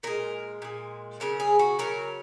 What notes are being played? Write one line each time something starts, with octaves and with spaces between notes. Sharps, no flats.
A#2 G#3 A#4
A#2 G#3
C#3 F#3 A#4
G#4
F#4
C#3 F#3 A#4